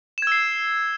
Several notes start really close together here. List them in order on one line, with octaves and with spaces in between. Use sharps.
E7 G#6 E6 C7